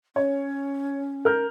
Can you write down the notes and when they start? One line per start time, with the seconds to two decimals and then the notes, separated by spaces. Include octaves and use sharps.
0.16 C#4 C#5
1.25 A#4 F6 G6